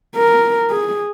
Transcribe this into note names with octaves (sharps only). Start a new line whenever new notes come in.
A#4
G#4